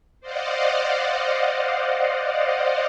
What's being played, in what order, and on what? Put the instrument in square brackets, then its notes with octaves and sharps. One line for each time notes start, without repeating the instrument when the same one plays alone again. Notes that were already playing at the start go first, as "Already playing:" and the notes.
[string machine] C5 D5 D#5 F5 F#5